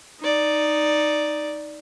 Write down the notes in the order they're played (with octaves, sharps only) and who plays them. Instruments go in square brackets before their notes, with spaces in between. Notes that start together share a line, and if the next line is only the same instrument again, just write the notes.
[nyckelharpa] D#4 D5